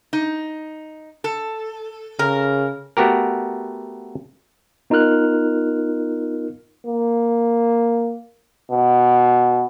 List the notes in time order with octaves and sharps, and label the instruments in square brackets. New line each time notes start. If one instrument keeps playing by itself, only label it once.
[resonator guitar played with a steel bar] D#4
A4
[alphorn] C#3 [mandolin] A#4
[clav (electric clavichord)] A3 B3 F#4 G4 A#4
[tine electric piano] B3 D#4 F4 A#4 F6 F#6
[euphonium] A#3
B2